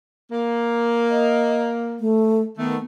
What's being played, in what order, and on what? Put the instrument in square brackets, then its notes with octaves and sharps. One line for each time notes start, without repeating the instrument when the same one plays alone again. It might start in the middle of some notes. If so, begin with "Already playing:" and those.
[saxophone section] A#3
[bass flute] D#5
A3
[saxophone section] D#3 A3 [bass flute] B3